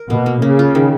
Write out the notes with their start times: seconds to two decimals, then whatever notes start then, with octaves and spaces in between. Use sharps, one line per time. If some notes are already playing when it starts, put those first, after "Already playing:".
Already playing: A#4
0.10 B2 A#3
0.26 A#3
0.42 C#3 A#3
0.59 F4
0.75 D#3